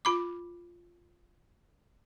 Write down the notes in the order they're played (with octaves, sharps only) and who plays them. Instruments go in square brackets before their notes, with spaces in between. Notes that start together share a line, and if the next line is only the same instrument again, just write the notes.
[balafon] F4 B5 D6